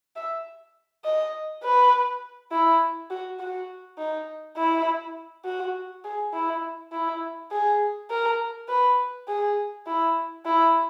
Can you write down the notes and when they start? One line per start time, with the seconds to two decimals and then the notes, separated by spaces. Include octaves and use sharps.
0.16 E5
1.04 D#5
1.63 B4
2.51 E4
3.10 F#4
3.39 F#4
3.98 D#4
4.57 E4
5.45 F#4
6.04 G#4
6.33 E4
6.92 E4
7.51 G#4
8.10 A#4
8.69 B4
9.28 G#4
9.87 E4
10.46 E4